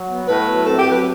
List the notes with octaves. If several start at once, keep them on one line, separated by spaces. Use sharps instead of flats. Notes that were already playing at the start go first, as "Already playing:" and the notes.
Already playing: F#3
B3
A2 B4
F#3
C4 A4
G4
F#3
B4